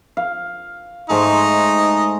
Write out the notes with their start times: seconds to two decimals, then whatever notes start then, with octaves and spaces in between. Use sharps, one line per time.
0.17 F5
1.10 G#2 G#3 A3 D#4